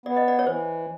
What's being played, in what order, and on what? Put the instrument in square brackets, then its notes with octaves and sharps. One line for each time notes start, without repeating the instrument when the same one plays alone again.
[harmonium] B3 [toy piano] D5
[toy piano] D#5
D5
C#5
[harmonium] E3 [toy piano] C5